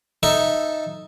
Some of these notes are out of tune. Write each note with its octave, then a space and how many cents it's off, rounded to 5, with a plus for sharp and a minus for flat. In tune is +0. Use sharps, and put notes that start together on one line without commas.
D#4 +0 A4 +0 E5 +0